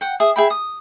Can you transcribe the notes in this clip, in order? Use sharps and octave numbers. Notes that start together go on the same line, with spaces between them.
F#5 G5
G#4 E5 D#6
G#4 E5 G5 B5
D#6